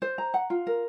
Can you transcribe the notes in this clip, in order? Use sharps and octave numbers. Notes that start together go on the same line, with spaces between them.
C5
A#5
F#5
F4
A#4